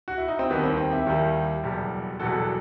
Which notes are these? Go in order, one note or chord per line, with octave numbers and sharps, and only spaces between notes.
F#4
E4
D#4
C4
D#2 D#3 G3 B3
C4
C4
E4 G4
D#2 D#3 G3
F#1 E2 B2 G3
F#1 E2 B2 G3 F#4 A4